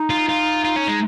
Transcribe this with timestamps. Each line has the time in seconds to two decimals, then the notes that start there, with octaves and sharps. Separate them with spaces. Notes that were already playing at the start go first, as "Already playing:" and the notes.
Already playing: D#4
0.10 F4
0.29 F4
0.65 F4
0.76 C#4
0.88 G#3